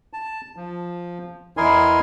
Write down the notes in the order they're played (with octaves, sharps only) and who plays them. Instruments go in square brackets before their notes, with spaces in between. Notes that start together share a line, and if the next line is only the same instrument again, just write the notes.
[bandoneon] A5
F3
E2 E4 A#4 D#5 G#5 C6